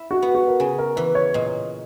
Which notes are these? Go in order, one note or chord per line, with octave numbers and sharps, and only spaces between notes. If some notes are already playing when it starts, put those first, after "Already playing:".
Already playing: E4
F#4
B3
F#4
A#4
C#3 G#4
A#4
E3 B4
C#5
A#2 D#5